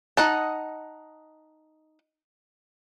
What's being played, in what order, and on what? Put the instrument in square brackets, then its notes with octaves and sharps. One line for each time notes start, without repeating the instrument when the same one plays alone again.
[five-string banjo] D#4 D#5 F#5 A5